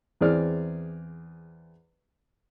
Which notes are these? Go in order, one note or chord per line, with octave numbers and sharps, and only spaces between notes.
E2 C4 G#4 D5 F6